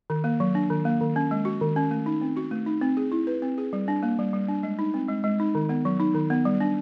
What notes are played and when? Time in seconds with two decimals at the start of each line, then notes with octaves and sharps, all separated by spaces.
0.10 D#3
0.24 A#3
0.40 F#3
0.55 D4
0.70 D#3
0.85 A#3
1.01 D#3
1.16 C#4
1.31 G#3
1.45 F#4
1.61 D#3
1.76 C#4
1.91 A3
2.06 D#4
2.21 C4
2.36 F#4
2.51 A3
2.66 D#4
2.81 C4
2.97 G#4
3.12 E4
3.27 B4
3.42 C4
3.58 G#4
3.73 G3
3.88 D4
4.03 A#3
4.19 G3
4.33 G3
4.48 D4
4.63 G#3
4.79 D#4
4.94 C4
5.08 G#3
5.24 G#3
5.40 D#4
5.55 D#3
5.69 B3
5.85 F#3
6.00 D#4
6.15 D#3
6.30 B3
6.45 G3
6.60 D4